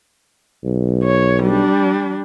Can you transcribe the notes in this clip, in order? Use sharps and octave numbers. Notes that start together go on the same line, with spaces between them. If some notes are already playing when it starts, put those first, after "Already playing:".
B1
C#5
G3 D4